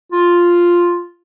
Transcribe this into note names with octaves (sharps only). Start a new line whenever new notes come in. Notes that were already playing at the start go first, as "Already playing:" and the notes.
F4